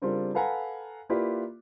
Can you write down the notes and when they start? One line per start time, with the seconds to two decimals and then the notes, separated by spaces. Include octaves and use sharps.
0.02 C#3 G3 C4 D4 F4 A#4
0.35 A4 B4 F5 F#5 G#5 A#5
1.09 A#3 E4 F4 G4 B4 D5